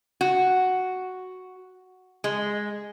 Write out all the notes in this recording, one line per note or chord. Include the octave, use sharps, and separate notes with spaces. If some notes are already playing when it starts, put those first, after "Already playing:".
F#4
G#3